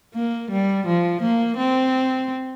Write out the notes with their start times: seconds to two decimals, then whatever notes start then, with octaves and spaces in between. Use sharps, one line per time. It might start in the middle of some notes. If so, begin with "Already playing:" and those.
0.15 A#3
0.51 G3
0.87 F3
1.22 A#3
1.57 C4